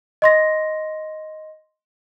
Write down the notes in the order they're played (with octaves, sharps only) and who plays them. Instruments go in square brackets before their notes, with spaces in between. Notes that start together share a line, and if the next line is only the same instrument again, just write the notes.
[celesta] D#5 C6 A#6